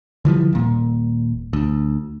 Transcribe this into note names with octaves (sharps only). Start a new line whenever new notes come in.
D3 E3 F3 G3
D#1 A#2
D2